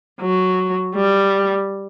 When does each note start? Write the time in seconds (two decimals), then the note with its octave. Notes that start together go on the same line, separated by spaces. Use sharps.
0.21 F#3
0.96 G3